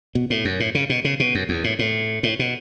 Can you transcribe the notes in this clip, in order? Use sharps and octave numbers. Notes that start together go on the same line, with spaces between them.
B2
A2
F#2
A2
C#3
B2
C#3
B2
F#2
E2
A2
A2
A2
B2